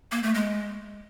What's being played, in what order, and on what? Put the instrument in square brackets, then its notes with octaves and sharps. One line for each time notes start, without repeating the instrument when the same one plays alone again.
[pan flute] A#3
A3
G#3